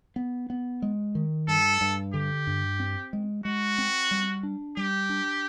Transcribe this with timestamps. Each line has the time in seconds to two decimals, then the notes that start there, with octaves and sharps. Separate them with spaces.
0.16 B3
0.50 B3
0.82 G#3
1.15 D#3
1.48 G2 A4
1.81 G2
2.14 D3 G4
2.47 G2
2.80 C4
3.13 G#3
3.45 G#3 F#4
3.78 C4
4.11 G3
4.43 D4
4.77 G3 G4
5.10 D4